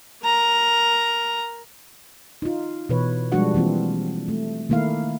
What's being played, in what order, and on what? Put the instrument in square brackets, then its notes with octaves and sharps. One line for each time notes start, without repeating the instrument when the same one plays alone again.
[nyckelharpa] A#4 A#5
[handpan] D#4 F4
B2 E3 B4 C#5
F3 G3 G#3 D4 F#4 F#5
E3 A#3 C4 F4
A3
D#3 A3 A#3 E4 F5